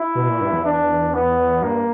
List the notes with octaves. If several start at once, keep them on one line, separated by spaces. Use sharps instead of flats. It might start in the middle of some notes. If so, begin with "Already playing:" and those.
Already playing: E4
B2
A#2
G2
E2
D4
B3
G2 A#3